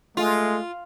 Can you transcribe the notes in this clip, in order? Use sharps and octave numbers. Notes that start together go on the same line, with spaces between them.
G#3 A3 F4